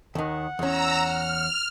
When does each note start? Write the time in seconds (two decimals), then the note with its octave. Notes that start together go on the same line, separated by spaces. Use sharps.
0.15 D#2 D#3 F#5
0.59 E2 C#4 A#5 E6
0.99 F6